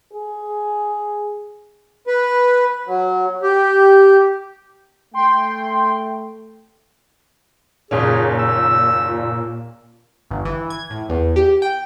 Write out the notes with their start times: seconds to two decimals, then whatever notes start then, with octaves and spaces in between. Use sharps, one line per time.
0.13 G#4
2.07 B4
2.87 F#3
3.42 G4
5.14 A3 G5 C6
7.91 F#1 D#2 A#2 C#4 G#4
8.39 E6
10.31 G1
10.45 E3
10.70 G#6
10.90 A2
11.09 E2
11.36 G4
11.62 G5